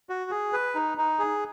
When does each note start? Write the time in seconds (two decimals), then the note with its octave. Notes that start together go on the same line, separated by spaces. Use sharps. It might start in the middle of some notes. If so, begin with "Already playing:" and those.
0.09 F#4
0.31 G#4
0.53 B4
0.75 D#4
0.98 D#4
1.19 G#4